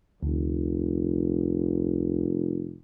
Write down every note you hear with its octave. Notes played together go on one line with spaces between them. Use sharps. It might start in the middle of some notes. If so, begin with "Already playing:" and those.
F1 D2